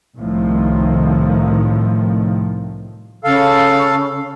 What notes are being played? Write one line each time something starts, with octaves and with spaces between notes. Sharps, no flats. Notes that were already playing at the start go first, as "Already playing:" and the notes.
C2 A2 D#3 F3
C#3 A4 F5